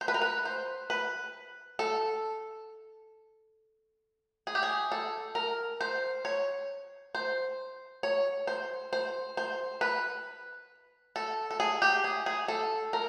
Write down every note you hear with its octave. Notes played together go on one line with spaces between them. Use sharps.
C5
B4
A#4
B4
C5
B4
A4
G#4
G4
G#4
A4
A#4
C5
C#5
C5
C#5
C5
C5
C5
B4
A4
A4
G#4
G4
G#4
G#4
A4
A#4